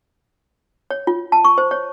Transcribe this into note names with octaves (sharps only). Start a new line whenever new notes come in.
C#5
F4
A5
C#6
C5
C#5